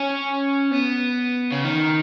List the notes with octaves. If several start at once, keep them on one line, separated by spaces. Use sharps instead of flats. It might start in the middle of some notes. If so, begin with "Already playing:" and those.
Already playing: C#4
B3
C#3
D#3